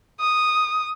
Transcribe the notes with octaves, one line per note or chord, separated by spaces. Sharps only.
D#6